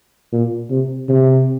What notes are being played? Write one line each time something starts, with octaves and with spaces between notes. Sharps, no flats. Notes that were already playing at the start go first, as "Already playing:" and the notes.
A#2
C3
C3